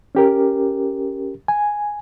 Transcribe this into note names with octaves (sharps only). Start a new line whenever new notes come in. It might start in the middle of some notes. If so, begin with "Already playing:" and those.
C#4 G4 A#4
G#5